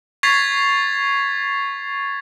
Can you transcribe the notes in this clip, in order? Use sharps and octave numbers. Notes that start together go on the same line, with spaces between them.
C#6 G#6 A6 B6 C7 F7